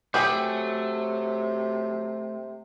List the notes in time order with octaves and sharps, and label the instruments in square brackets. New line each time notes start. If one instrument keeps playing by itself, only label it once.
[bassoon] C3 [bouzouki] F#3 [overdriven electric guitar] A3 [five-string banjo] G4 G#4 G5